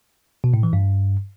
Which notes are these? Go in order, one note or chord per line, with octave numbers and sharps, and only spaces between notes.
B2
A2
E3
G2